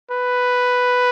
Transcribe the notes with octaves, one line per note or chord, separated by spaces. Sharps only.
B4